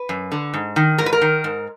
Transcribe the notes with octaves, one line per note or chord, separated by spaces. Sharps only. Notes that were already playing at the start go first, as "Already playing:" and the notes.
Already playing: B4
F#2
D3
G#2
D#3
G#2 A#4
B4
A#4
D#3
G#2